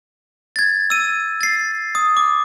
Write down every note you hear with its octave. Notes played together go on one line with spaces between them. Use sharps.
G#6 A6
E6 D#7
A6 C7
D#6
D6